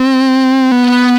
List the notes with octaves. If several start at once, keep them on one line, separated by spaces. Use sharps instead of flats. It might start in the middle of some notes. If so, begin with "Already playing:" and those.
Already playing: C4
B3